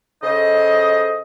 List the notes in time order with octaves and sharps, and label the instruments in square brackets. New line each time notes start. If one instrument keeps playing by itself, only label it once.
[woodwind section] C#3 A4 C5 D#5